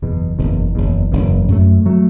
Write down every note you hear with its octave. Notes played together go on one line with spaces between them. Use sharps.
F#1 E2 B2
F#1 E2 B2
F#1 E2 B2
F#1 E2 B2
F#2 F#3 A3
F#3 A3